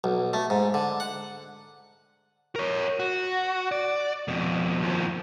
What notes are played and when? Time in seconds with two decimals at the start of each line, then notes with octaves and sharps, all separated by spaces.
0.04 B1
0.33 A3
0.50 G#2
0.74 D3
1.00 F#5
2.56 A#4 C#5
2.99 F#4
3.72 D5
4.28 F2 B2
4.82 D#2 F3